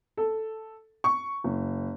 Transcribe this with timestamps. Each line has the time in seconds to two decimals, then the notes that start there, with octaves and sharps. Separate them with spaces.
0.17 A4
1.04 C#6
1.44 F#1